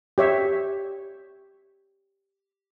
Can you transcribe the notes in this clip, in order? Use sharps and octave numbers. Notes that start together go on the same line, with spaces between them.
G4 C#5 E5